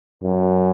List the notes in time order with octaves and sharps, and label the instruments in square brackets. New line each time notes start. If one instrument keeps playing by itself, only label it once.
[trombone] F#2